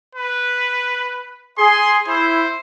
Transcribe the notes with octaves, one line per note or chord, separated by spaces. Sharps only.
B4
G#4 C6
E4 C5